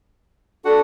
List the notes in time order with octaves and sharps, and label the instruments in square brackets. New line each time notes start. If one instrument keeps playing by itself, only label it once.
[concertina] D4 F#4 F#5 [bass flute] A4